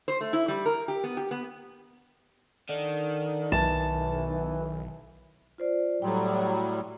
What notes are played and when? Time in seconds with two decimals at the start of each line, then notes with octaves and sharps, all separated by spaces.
0.08 C5
0.21 A3
0.33 E4
0.48 G3
0.65 A#4
0.88 G4
1.04 B3
1.17 G4
1.31 B3
2.69 D3 D#3
3.52 B1 E3 A5
5.58 F4 C5 D5
6.02 A2 F#3 G3 G5 C6